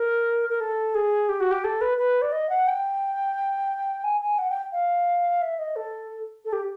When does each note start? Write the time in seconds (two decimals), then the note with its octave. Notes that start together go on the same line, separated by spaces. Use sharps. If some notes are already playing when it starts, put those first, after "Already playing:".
Already playing: A#4
0.49 A#4
0.60 A4
0.95 G#4
1.29 G4
1.40 F#4
1.51 G4
1.64 A4
1.81 B4
1.98 B4
2.22 D5
2.32 D#5
2.50 F#5
2.67 G5
4.04 G#5
4.21 G#5
4.38 F#5
4.50 G5
4.72 F5
5.42 E5
5.59 D#5
5.76 A4
6.45 A4
6.53 G4